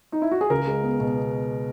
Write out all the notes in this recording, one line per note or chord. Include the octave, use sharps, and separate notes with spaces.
D#4
E4
F#4
G#4
C#2 A#4
G#3
B3
B2